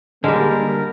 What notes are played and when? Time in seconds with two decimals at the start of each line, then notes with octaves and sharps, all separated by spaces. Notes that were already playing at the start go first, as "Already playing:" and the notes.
0.24 D3 G3 G#3 A#3 A#4